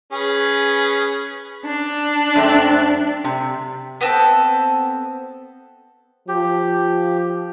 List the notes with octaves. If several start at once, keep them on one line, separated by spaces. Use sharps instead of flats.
C#4 G#4 B4
D4
F#2 A3 C4
C3
B3 C4 A4
F3 G4